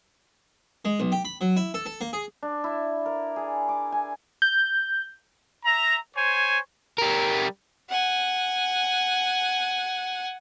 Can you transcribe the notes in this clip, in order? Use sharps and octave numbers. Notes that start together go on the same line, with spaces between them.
G#3
B1
G4
B5
F#3
E4
A4
A4
A#3
G#4
D4
E4
A#4
G#4
D6
G#5
G6
E5 A#5
C5 C#5 G#5
G3 A#4
F#5 G#5